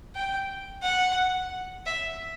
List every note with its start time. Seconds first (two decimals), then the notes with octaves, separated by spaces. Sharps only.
0.15 G5
0.83 F#5
1.86 E5